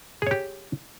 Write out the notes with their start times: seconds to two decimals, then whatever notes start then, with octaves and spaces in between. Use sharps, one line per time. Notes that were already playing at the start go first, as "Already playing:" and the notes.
0.22 G#4
0.27 C#5
0.31 G4